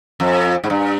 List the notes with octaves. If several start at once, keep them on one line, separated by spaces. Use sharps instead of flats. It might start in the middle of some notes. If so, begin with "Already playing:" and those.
F2
G#2
G2